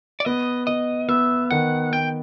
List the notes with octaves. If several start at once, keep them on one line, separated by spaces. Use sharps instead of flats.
D5
B3 D#5
B3 D#5
B3 E5
D#3 F#5
B3 G5